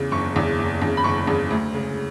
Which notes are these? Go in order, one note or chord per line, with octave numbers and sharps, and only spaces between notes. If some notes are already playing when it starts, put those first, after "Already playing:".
Already playing: E2 C#3
F#1 C#6
E2 C#3
F#1
E2 C#3
B5
F#1 C#6
E2 C#3
D2
C#3 G#3